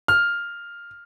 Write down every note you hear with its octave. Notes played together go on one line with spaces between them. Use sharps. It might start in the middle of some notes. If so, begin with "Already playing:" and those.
F6